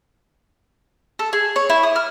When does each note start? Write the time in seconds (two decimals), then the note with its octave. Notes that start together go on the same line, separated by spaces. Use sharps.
1.19 A4
1.33 G#4
1.56 C#5
1.70 E4
1.83 D#6
1.96 F6